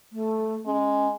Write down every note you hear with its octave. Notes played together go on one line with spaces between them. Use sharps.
A3
G#3 C#4